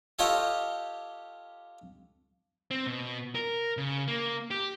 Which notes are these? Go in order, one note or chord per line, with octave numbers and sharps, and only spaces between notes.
F4 G4 A4 C#5 D#5
C4
B2
A#4
C#3
A#3
G4